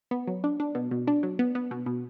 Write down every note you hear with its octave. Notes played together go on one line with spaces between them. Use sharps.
B3
F#3
D4
D4
B2
B2
D4
F#3
B3
B3
B2
B2